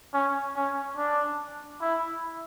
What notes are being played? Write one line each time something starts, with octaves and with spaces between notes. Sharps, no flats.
C#4
C#4
D4
E4